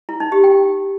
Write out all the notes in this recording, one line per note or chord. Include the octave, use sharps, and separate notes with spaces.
E4
D#4
G4
G5